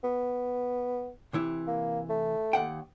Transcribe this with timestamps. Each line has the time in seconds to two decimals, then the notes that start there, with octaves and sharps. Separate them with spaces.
0.04 B3
1.33 C3 E3 E4
1.67 A#3
2.09 A3
2.53 D#2 F#5 G5